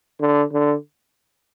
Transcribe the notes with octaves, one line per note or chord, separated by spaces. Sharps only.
D3
D3